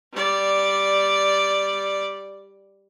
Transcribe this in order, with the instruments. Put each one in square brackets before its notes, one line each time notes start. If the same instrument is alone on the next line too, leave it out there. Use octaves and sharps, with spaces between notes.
[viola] G3 D5